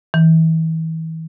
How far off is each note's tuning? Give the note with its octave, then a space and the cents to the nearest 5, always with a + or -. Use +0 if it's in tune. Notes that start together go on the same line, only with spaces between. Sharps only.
E3 -35